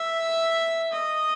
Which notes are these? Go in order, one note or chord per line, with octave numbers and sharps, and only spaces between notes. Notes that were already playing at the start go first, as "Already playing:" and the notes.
Already playing: E5
D#5